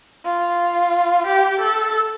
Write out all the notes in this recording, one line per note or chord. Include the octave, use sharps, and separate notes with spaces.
F4
G4
A4